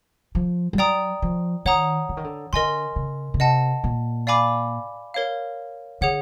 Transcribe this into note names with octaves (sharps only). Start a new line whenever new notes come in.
F3
G3
F#3 D5 G5 A#5 D#6
F3
D#3 C#5 F#5 A#5 D#6
D3
D#3
D3
D3 A#4 D#5 G#5 C6
C#3
C#3
C3 D#5 F#5 A5
A#2
D5 F5 G#5 B5 D6
A#4 C#5 F5
D3 G#4 C#5 F#5